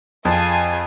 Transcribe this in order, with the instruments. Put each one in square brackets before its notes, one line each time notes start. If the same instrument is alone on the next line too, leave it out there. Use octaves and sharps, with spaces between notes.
[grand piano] F2 [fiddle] F4 G#4 [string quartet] G#5 A5